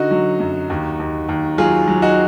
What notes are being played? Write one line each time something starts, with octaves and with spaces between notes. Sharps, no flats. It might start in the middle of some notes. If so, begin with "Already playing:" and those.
Already playing: D3 D#4 F#4
F#3
F#2
D#2
D#2
D#2
F#3 F4 G#4
F#3
D#4 F#4